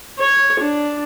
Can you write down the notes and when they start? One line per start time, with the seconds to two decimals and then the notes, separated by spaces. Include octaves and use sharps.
0.19 C#5
0.61 D4